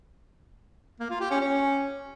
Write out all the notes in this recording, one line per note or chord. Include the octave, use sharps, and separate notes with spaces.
A#3
F4
G4
C#4
C#4